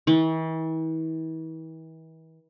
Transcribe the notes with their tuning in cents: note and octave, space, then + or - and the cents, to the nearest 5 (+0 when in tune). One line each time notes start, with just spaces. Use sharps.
E3 -40